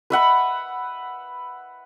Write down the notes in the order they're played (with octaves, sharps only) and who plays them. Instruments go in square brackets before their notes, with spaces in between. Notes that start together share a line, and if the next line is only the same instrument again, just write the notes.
[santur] B4 E5 F#5 B5